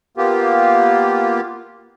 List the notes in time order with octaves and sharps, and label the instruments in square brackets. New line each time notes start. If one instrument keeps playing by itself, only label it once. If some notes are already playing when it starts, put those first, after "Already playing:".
[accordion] A#3 B3 F4 G4